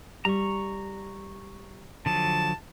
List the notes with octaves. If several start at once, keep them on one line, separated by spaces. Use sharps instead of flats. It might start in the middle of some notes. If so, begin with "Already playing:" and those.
G3 A#5 C#6
D3 F3 F#3 A5